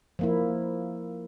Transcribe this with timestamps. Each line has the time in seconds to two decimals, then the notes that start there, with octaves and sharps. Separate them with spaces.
0.19 F3 A#3 E4